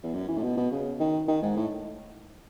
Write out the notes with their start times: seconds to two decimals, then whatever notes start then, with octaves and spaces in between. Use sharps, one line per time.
0.03 E2
0.14 F#2
0.28 E3
0.37 A2
0.43 B2
0.57 B2
0.72 C#3
1.00 D#3
1.28 D#3
1.42 G#2
1.56 A2